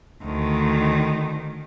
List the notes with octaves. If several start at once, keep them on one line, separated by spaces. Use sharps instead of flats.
D2 D#3